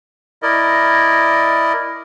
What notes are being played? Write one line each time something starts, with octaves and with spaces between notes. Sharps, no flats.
E4 A#4 D5 D#5